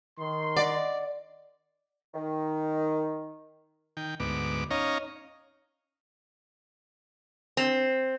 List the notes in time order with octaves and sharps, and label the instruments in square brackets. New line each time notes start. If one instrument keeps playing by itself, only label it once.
[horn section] D#3 C6
[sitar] D5 [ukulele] D#5 F#5
[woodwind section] D#3
[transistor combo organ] D#3 G5
D2 G#2 B3 D6
C#4 D#4 C#5 D#5 F5 A#5
[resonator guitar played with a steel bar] C4